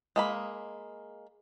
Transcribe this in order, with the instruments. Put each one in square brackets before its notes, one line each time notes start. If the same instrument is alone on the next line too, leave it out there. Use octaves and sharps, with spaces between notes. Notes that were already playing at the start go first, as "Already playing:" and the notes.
[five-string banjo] G#3 A#3 B5